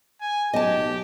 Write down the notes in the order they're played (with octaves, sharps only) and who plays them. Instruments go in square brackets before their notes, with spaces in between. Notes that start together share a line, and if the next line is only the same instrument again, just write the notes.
[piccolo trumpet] G#5
[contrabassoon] B1 [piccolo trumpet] G4 [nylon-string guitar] D#5 A5